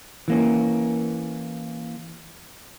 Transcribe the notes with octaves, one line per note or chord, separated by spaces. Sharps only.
E3 A#3 C#4